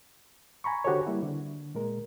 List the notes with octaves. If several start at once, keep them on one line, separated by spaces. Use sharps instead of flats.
G#5 A#5 B5 C#6
D3 F#4 G4 A4 C5 C#5
G3 A#3 E4
D3
A#2 G#3 A#4